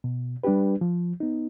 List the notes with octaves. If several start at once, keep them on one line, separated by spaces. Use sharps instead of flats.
B2
G3 D4 G4 B4
F3
B3 D#4